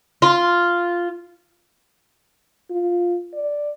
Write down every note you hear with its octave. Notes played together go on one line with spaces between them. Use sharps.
F4
F4
D5